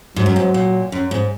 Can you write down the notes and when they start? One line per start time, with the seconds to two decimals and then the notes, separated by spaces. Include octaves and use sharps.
0.16 G#2 F#3
0.26 F#2
0.36 G#2
0.54 A#2
0.92 F#2
1.11 G#2